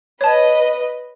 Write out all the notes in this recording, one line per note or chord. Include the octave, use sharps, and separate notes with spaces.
B4 C#5 D#5 A5